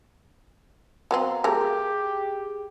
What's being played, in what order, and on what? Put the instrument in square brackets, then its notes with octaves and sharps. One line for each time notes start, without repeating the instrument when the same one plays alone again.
[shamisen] F#3 B3 C4 [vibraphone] F5 A#5
[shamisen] F#3 A3 A#4 [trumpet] G4 [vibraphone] G#4